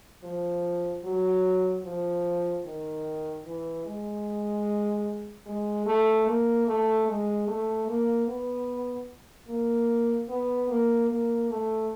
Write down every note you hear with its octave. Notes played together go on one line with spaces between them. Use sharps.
F3
F#3
F3
D#3
E3
G#3
G#3
A3
A#3
A3
G#3
A3
A#3
B3
A#3
B3
A#3
A#3
A3